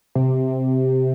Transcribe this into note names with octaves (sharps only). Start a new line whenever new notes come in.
C3